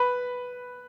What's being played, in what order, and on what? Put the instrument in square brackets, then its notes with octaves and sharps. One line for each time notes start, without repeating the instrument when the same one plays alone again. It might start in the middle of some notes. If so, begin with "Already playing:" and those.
Already playing: [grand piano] B4 B5